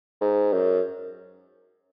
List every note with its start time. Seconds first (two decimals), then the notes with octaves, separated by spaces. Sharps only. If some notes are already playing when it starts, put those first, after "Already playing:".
0.21 G#2
0.53 F#2